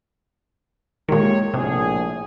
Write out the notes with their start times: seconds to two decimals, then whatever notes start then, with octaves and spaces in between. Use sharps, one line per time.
1.09 A#2 D#3 G#3 G4 C#5
1.54 A#1 A2 C3 G#4